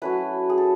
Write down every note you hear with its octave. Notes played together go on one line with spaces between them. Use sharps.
F#3 A3 C#4 E4 B4
G#4
A4